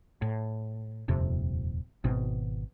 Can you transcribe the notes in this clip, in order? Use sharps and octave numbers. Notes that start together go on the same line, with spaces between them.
A2
D#1 F2 C3
G#1 B2 C4